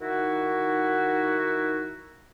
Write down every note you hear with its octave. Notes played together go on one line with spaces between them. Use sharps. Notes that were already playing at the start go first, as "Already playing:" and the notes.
D#3 D#4 E4 F#4